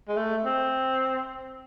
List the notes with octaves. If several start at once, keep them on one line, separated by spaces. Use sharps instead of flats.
G#3
A3
C4